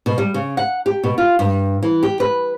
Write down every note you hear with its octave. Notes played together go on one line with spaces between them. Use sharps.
B2
G3
C#3
F#5
G4
B2
F4
G2
E3
G4
B4